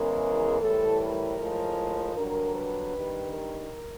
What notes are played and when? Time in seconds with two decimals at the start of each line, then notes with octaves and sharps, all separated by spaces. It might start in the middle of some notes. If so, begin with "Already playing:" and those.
Already playing: E2 C#3 E3 G#3 A#4
0.61 A2 E3 G3 A4
1.00 A#4
1.38 A2 F3 G#3
2.16 G2 D3 F#3 A#4
2.55 B4
2.94 G2 D#3 G3
3.33 A#4